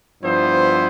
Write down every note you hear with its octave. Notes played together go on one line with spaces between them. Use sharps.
G2 F3 B3 E4 C5